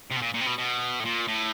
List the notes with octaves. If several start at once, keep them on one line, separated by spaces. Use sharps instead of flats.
C3
B2
A#2
A#2
C3
B2
B2
A2
A#2
A2